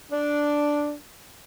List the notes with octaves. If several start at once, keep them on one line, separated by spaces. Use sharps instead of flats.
D4